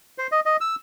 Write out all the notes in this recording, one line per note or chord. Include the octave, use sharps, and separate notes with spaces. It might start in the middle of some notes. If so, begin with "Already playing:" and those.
C5
D#5
D#5
E6